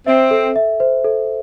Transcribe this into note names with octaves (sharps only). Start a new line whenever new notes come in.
C4 E5
A4
E5
C5
A4